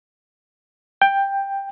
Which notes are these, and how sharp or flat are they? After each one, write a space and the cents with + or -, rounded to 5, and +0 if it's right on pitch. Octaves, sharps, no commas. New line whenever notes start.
G5 +10